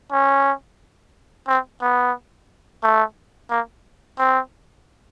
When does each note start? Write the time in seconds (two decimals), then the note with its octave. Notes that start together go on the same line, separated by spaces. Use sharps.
0.12 C#4
1.48 C4
1.82 B3
2.83 A3
3.50 A#3
4.19 C4